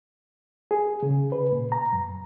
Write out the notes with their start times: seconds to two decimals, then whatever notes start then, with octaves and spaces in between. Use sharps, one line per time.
0.71 G#4
1.03 C#3
1.32 B4
1.52 A#2
1.72 A#5
1.93 F#2